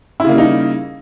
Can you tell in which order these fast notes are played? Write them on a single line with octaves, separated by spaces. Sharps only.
E4 C#3 A#3 G3 D#4